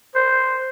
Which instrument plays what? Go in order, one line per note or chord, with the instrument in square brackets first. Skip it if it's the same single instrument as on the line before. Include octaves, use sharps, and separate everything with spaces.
[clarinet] C5